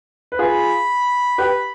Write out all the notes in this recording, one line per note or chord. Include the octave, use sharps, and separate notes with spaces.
B4
F4 G#4 B5
G4 B4